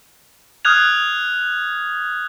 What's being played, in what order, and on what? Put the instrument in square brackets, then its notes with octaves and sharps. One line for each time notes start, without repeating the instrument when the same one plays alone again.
[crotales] D#6 F6 F#6 G#6 F7